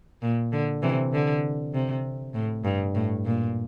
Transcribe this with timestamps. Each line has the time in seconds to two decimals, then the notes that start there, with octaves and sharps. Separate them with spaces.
0.22 A#2
0.52 D3
0.82 C3 E3
1.13 D3
1.74 C3
2.34 A2
2.64 G2
2.95 A2
3.25 A#2